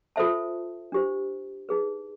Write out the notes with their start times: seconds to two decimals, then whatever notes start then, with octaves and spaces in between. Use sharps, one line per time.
0.16 F4 A4 C5 E5 A5
0.92 D4 G4 C5
1.69 D#4 G#4 B4